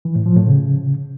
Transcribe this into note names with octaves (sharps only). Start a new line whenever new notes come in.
E3
A2
F3
A2
C#3